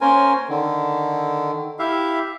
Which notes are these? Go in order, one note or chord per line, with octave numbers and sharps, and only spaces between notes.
A#3 C#4 A#4 C5 G#5
D3 D#3
E4 G4 E5 F5